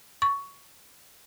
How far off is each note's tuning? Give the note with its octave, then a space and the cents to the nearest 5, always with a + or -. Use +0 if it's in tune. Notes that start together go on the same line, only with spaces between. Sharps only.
C#6 +15